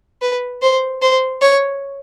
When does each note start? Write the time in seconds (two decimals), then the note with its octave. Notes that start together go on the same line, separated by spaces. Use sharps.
0.22 B4
0.62 C5
1.02 C5
1.41 C#5